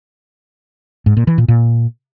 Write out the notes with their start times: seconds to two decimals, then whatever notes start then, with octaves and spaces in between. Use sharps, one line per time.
1.06 G#2
1.17 A#2
1.27 E3
1.38 A#2
1.48 A#2